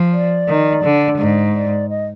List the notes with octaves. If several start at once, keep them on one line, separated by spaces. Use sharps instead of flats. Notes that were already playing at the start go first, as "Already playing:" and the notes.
Already playing: F3
D5
D#3
D3
G#2
D5
D#5